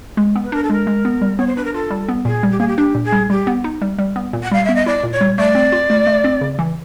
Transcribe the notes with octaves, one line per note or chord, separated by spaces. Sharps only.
G#3
B3
B4
D4 A#4
A4
G#3 A#4
G#3
B3
G3
B3 C#5
C5
D4 B4
A#4
F4 A4
G3
B3
A#2 G#4
G3
G4
A#3 G#4
G4
D4 G4
A#2
G#4
G3
G3 G4
B3
D#4
G3
G3
B3
A#2
F#5
G3 F5
B3 E5
D#5
E4 D5
A#2
C#5
G3
A3 D5
C4
F4
A3
A3
C4
C#3
E3